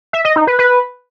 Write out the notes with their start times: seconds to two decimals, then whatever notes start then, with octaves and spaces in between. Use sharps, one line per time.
0.13 E5
0.25 D#5
0.36 D#4
0.47 B4
0.59 B4